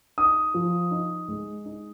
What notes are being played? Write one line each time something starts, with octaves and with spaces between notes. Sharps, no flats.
D#4 D#6
F3
D#4
G#3
D#4